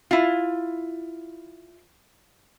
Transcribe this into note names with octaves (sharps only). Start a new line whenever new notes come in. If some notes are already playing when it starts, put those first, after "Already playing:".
E4 F4